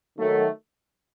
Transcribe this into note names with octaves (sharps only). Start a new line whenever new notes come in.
D#3 F#3 A3